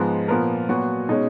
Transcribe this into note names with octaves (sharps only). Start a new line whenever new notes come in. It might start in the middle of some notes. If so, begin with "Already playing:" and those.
Already playing: G#2 F3 G#3 B3
A#2 F3 B3 A#4
A#2 F#3 B3 F#4
B2 G#3 C#4 D#4